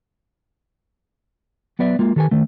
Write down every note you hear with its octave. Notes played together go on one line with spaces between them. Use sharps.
F#3 B3 B4 D5 E5
G#3 A#3 F4
D#3 G4 A4 B4 G#5
D#3 A3